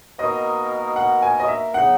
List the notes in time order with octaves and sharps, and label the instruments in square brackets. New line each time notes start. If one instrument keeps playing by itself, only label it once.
[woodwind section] B2 A#3 D#4 A#4 [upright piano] D#5
[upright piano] F#5
G#5
D#5
E5
[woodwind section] C#3 F#3 B3 D#4 [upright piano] F#5